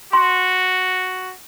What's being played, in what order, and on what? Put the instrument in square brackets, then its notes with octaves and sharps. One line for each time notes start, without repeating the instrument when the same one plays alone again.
[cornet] F#4 [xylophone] C6